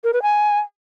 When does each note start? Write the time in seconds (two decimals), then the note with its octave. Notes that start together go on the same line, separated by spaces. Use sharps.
0.04 A#4
0.13 B4
0.22 G#5